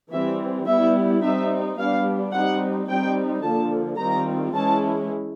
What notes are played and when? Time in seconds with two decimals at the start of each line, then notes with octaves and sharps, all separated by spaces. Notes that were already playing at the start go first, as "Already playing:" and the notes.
0.12 E3 G3 C4 E5
0.67 G3 B3 E4 E5
1.22 G3 C4 D#4 E5
1.78 G3 B3 D4 F5
2.33 G3 C4 D#4 F#5
2.88 G3 C4 D#4 G5
3.43 D3 F3 A#3 A5
3.98 D#3 G3 C4 F4 A#5
4.54 E3 G#3 C#4 E4 A5